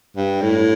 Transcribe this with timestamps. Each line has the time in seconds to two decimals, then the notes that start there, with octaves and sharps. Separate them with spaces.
0.16 G2
0.42 A2